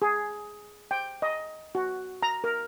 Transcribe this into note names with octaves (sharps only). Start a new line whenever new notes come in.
G#4
G5
D#5
F#4
A#5
A#4